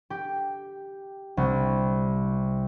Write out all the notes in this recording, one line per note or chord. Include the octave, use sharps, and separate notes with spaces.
G4
C2